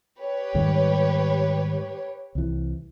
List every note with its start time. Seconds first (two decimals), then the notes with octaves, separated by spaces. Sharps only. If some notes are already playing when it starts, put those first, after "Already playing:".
0.19 G4 B4 C#5
0.55 G#2 D#3 G3
2.35 C2 E3